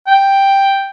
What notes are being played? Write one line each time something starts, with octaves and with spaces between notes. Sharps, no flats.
G5